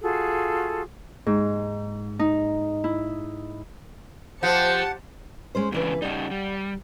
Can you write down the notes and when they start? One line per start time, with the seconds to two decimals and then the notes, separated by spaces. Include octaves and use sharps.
0.01 F4 F#4 G#4 A4
1.27 G#2
2.19 D#4
2.84 E4
4.43 F3 G4 C5 F#5 A5 C#7
5.55 G#3 C#4 C5
5.72 D#2 G#2 C#3 E3 D4 B4
6.02 C#3 G3 D#4 D5 F#5
6.31 G3